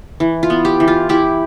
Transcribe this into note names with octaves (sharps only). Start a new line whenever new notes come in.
E3
F4
B3
G4
E3
F4
E4 G4